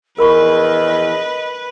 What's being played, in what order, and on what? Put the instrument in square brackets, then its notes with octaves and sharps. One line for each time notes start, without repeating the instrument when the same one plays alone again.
[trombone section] A#1 E2 [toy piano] A#4 B5 C#6 [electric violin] B4 [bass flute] D#5